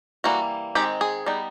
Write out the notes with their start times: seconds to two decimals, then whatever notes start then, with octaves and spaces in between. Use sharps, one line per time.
0.24 E3 G3 A#3 F#4
0.75 D#3 G#3 C4 G4
1.01 G#4
1.26 G3 B3 D#4